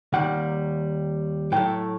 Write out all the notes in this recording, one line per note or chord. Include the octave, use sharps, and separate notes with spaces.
D#2 D#3 G3 A#3 F#5
A2 F#3 A3 G5